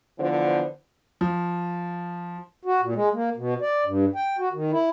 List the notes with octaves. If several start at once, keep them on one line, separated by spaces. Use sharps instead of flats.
D3 E3 F3 B3 C5
F3
F#4
A#2
G#3
A#3
B2
D5
G2
G5
F#4
D#3
E4